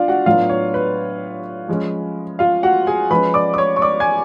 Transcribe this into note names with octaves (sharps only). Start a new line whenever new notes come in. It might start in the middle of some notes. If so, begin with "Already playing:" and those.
Already playing: D4 F4 D5 F5
F#4 F#5
A2 F#3 B3 D4 F4 F5
C#5
B4
F3 G#3 C#4
F4 F5
F#4 F#5
G#4 G#5
F3 G#3 C#4 B4 B5
D5 D6
D6
C#5 C#6
C#6
D5 D6
G#5 G#6